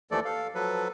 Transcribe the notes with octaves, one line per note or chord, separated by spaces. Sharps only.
D#2 E3 F3 A3 A4 D5
A4 F5
F3 F#3 A4 B4